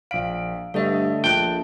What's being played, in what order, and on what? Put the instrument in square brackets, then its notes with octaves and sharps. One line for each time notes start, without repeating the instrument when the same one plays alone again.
[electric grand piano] A#1 D7 [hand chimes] F5
[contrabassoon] G2 [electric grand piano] D3 A3 [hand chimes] A4 D#5 E5
[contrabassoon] A#1 [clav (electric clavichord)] G5 [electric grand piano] A5 F#6